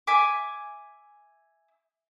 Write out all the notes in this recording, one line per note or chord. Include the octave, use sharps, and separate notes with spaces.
E5 G#5 D6